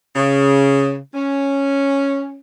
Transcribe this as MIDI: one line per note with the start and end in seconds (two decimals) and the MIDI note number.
0.16 0.96 49
1.14 2.37 61